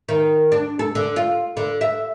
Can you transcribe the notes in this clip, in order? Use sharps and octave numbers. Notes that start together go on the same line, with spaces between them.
D#3
D4
A4
D3
F4
D3
E5